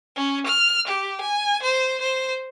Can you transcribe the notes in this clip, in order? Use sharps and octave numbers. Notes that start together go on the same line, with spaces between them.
C#4
F6
G4
G#5
C5
C5